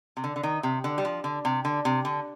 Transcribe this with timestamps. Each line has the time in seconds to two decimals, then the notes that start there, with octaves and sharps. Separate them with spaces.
0.17 C3
0.24 D3
0.36 D3
0.43 D#3
0.63 C3
0.84 D3
0.98 G3
1.05 F3
1.24 D3
1.45 C3
1.65 D3
1.85 C3
2.05 D3